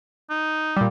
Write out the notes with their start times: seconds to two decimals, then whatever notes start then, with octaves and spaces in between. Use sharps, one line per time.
0.30 D#4
0.77 A#2 G3